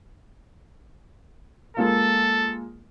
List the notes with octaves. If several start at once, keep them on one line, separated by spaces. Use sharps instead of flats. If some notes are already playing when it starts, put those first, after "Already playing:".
G#3 A#3 F4 A4